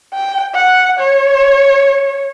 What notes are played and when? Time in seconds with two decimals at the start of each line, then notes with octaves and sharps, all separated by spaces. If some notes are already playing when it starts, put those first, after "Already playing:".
0.14 G5
0.54 F#5
1.00 C#5